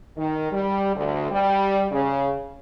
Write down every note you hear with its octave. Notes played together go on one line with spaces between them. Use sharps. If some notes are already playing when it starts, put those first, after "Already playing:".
D#3
G3
D2
G3
C#3